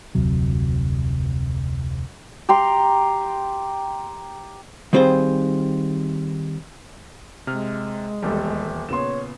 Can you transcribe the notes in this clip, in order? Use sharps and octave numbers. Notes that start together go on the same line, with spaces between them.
F1 D2 C3 F#3
G4 A#5 C6
D#3 G3 C4 F4 G#4 C5
C3 G#3 F6
D#1 E2 G3 A4
A#2 C#3 B3 C#5 C6 E7